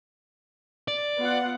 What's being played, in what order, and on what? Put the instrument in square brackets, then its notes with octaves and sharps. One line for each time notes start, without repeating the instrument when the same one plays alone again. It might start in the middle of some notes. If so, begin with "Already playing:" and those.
[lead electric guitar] D5
[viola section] B3 F4 F#5